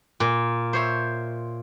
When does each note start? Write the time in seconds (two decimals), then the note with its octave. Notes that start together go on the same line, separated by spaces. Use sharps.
0.20 A#2
0.73 C5 C#5 E5